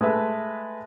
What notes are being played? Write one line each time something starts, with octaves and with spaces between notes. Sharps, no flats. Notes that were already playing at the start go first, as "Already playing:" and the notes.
G#3 A3 B4 E5